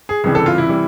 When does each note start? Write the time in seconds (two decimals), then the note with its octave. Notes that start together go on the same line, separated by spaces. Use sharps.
0.09 G#4
0.24 C#2 C3 E3 G3 G#4
0.35 A4
0.46 F4
0.58 E4
0.69 C3 E3 G3